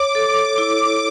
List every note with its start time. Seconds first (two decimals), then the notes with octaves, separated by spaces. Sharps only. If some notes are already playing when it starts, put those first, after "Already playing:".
Already playing: C#5 D6
0.15 A4
0.58 E4